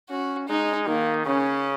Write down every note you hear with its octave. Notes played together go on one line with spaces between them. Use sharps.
C#4 F#4
G#3 D#4
D#3 A#3
C#3 C#4